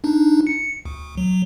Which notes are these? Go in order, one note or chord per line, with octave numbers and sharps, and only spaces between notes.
D4 D#4
C#7
D2
F#3